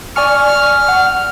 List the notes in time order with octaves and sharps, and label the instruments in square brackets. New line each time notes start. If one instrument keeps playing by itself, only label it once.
[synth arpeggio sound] D5 G#5 C#6 [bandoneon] F6
[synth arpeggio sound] F#5